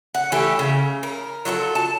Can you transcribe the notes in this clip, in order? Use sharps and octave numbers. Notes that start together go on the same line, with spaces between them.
F#5
E3 A3 D4 G4
C#3
A#4
F#3 F4 F#4 A4
A5